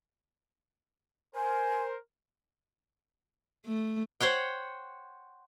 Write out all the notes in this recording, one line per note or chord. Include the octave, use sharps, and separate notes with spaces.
A#4 C5 G#5
A3
C5 C#5 F#5 G5